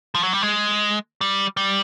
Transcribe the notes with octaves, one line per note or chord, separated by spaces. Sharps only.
F3
F#3
G3
G#3
G3
G3